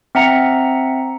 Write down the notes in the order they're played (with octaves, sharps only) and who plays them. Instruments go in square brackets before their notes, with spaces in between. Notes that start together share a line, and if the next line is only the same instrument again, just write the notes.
[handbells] C4 E5 F#5 A#5 C#7